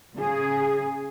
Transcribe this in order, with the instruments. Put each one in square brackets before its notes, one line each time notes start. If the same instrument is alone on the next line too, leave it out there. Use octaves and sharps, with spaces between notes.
[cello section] C#3 G#4